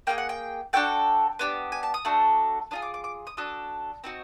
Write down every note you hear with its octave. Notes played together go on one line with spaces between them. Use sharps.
A#3 D#4 G#4 G5
F#5
G5
D4 F#4 A4 G5
B3 D4 G4
G#5
A5
D#6
A3 D4 F#4 A4
D4 F4 G#4 D#6
D6
D6
D6
D#6
D4 F#4 A4 D#6
C4 D#4 F#4